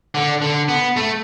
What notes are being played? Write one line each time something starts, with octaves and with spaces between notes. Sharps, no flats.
D3
D3
B3
A3